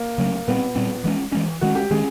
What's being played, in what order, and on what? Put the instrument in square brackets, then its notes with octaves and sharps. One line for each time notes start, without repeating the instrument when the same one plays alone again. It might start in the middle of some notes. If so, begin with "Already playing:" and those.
Already playing: [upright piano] A#3
[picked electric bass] C#3 F#3 A3 C#4
[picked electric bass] A#2 G3 C4 [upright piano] B3
[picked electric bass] A#2 G3 C4
E3 G#3 C#4
E3 G#3 C#4
[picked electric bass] D#3 G#3 C#4 [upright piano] F#4
[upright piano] G4
[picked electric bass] D#3 G#3 C#4 [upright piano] G#4